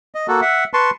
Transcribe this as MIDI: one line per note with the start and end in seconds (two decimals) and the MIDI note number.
0.15 0.27 75
0.28 0.40 58
0.28 0.40 66
0.28 0.40 69
0.42 0.64 76
0.42 0.64 78
0.74 0.91 71
0.74 0.91 81
0.74 0.91 84
0.74 0.91 85